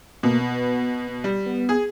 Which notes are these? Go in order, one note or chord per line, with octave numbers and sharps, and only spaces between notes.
B2 A#3
B3
G3
B3
G#4